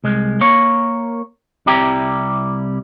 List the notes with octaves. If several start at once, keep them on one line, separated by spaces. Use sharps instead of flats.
C2 G#3
A#3 A#4 C#5
C2 C3 G3 E4 G4 A#5